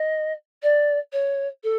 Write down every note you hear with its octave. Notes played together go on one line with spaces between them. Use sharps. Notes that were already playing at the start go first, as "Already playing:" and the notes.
Already playing: D#5
D5
C#5
A4